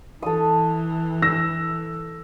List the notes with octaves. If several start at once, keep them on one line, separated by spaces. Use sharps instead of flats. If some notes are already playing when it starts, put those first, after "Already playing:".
E3 A4 D#6
E6 A#6